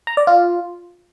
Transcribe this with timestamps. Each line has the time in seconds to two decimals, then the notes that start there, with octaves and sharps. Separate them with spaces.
0.07 A#5
0.17 D5
0.27 F4